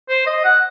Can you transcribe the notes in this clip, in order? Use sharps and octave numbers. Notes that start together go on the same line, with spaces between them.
C5
D#5
F#5